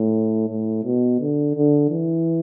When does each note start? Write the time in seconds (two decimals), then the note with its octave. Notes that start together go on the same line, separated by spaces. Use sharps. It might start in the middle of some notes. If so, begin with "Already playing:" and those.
Already playing: A2
0.50 A2
0.85 B2
1.20 D3
1.55 D3
1.90 E3